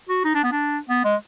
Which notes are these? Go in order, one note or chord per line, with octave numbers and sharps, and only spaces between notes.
F#4
D#4
D4
B3
D4
B3
G#3